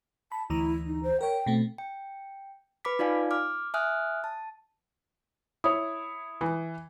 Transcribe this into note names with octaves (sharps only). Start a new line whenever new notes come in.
A5 B5
D2 E3 E4 A#5
D#4
C5
A#4 C#5 G5
B2 A3 C4
G5
B4 B5 D6 B6
D#4 F4 D5 F5 G#5
D6 F6
E5 G#5 D#6 F6 F#6
A5
E4 C#5 D#6
E3